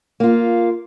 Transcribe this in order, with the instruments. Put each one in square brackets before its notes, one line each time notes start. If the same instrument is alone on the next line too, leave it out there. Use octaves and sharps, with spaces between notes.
[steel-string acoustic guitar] A#3 F4